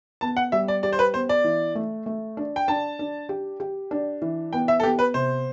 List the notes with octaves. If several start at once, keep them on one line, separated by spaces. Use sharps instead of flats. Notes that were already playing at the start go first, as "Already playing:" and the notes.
B3 A5
F#5
G3 E5
D5
G4 D5
C5
B4
B3 C5
D5
E3
A3
A3
D4
G5
D4 A5
D4
G4
G4
D4
E3
B3 G5
E5
A4
B3 G4
B4
C3 C5